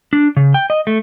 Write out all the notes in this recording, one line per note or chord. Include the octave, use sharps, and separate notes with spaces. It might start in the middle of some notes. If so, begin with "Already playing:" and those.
D4
C#3
G5
D#5
A3